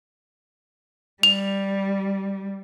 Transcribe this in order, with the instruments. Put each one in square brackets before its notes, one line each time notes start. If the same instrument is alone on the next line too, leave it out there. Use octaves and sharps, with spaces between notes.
[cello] G3 [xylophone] F7